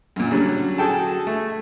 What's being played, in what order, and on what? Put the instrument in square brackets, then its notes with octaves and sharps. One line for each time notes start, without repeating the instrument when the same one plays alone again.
[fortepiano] F#2 A#2
D3 F#3 G3 C#4
F#4 G#4 A4 G5 A5
A3